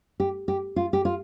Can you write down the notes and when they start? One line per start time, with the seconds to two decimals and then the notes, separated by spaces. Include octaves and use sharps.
0.20 G4
0.48 G4
0.76 F4
0.93 G4
1.05 F4